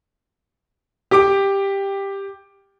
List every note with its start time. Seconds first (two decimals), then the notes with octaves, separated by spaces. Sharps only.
1.11 G4 G5 D6 D7